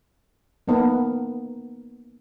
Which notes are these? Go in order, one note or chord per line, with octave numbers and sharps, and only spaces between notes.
A#3 B3 D#4 A#4